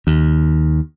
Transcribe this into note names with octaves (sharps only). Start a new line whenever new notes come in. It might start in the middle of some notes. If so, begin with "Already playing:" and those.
D#2